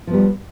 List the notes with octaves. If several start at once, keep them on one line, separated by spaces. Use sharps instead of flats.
F3 G3 B3